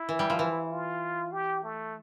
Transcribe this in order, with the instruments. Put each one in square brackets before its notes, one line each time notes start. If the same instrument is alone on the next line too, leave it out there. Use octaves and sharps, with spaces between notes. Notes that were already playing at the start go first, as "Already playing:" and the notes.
Already playing: [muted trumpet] E4
[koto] E3
G3
F3
E3
[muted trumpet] F4
G4
A3